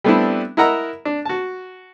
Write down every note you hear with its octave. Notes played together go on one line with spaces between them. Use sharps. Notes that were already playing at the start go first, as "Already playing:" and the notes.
G3 A3 B3 C4 D4 E4
E4 A#4 D#5 F#5 A#5 E6
D4
F#4 A5